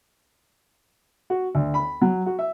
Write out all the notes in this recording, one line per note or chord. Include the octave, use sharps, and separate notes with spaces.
F#4
D2
B5
F#3
F#4
E5